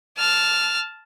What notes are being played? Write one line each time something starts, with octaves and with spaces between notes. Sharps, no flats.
A5 F6